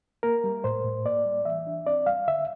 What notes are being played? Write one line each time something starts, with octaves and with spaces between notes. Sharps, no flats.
A#3 A#4
G3
A2 C5
A2
A#3 D5
G3
E3 E5
D4
C4 D5
G3 F5
D3 E5